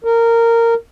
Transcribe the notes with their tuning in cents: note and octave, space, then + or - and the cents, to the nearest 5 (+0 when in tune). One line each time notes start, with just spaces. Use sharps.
A#4 -15